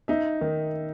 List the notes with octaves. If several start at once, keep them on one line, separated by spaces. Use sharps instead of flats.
D#4 E5
D#3